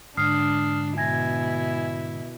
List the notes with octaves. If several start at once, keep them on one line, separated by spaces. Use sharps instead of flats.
G#2 D3 D4 D#6 F6 C7
B2 E4 G#5 G#6 A#6